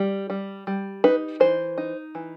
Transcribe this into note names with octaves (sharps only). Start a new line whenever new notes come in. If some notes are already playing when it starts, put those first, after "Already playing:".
Already playing: G3
G3
G3
D#4 B4
E3 C5
D#4
E3